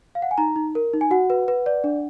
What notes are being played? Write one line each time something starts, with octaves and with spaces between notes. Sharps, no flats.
F5
F#5
G#5
D#4 A#5
D#4
A#4
D#4
G#5
F#4 F#5
B4
B4
D5
D4